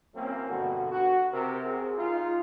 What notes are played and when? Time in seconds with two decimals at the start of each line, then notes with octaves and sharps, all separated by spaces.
0.14 E3 F#3 A#3 C4 C#4
0.48 G2 B2 D3 F#4
0.91 F#4
1.32 C3 A#4
1.64 C4 F#4 G#4
1.97 G#3 D#4 F4